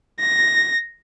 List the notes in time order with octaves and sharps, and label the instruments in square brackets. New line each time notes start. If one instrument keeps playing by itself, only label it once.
[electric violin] A#6